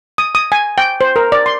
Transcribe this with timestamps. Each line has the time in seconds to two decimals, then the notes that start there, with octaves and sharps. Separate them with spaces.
0.18 D#6
0.35 D#6
0.52 G#5
0.78 G5
1.01 C5
1.16 A#4
1.32 D5
1.46 C6